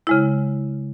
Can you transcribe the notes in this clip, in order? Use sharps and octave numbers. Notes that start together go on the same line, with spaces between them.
C#3 G#3 E4